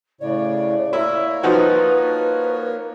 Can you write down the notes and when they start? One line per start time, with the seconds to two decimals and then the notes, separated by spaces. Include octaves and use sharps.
0.21 A2 C#3 C#5 D5
0.93 A#3 E4 A#4 C#5
1.43 F3 D#4 F#4 B4